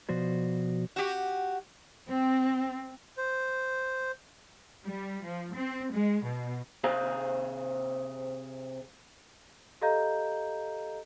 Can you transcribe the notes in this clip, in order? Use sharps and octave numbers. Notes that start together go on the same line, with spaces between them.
B2 F3 F#4 C5 D5
F#4 G4
C4
C5
G3
F3
C4
G#3
B2
C3 G#4 C5 F5 A#5
G4 A4 D#5 F5 A#5 G6